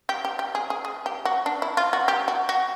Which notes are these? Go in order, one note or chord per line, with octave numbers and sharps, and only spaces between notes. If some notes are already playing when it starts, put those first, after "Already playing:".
G4
G4
G4
G#4
G#4
G#4
G4
F#4
D4
E4
F4
F#4
G4
F#4
F#4